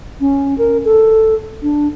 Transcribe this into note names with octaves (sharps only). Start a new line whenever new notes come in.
C#4
A#4
A4
D4